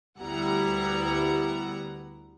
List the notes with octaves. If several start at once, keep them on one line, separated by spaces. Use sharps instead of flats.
D2 G3 B3 E4 F#5 A#5